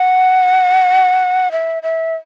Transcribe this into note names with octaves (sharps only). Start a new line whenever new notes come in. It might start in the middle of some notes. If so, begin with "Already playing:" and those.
Already playing: F#5
E5
E5